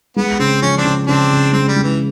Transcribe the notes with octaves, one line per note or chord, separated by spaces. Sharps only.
G#3 B3
C#3 C4
F3 C#4
C4 D4
C#3
C#3 C4 D4
C#3
G#3 C4
G3
G#3
E3